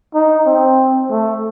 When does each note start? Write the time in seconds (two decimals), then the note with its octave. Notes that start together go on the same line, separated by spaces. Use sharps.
0.15 D#4
0.46 C4
1.11 A3